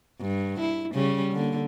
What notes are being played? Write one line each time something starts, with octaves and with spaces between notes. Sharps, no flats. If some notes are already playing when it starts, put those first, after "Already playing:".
G2
E4
C#3 G3 C#4
D3 A#3